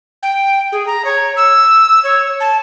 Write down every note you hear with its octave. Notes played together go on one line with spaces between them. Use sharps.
G5
G#4
A#5
C#5
E6
C#5
A5